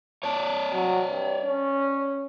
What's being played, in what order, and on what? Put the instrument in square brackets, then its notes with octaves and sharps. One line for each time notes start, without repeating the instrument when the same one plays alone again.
[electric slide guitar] C#5 D5 A5
[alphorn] F#3
G2
C#4